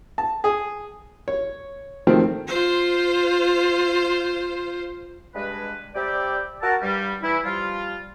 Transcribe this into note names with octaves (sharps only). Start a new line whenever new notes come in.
A5
G#4
C#5
D#3 F3 A3 C4
F4 C5
G2 G#3 B4
C3 G3 G4 D5 E5 G5
F#4 A#4 A5
G2 G3
E3 E4
F3 G3 F4